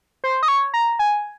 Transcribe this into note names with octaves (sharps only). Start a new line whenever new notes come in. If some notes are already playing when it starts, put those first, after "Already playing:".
C5
D#5
C#5
A#5
G#5